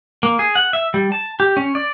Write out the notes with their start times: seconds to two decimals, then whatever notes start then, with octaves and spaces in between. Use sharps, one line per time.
0.23 A#3
0.39 G#4
0.55 F#5
0.73 E5
0.94 G3
1.12 A5
1.40 G4
1.57 C#4
1.75 D5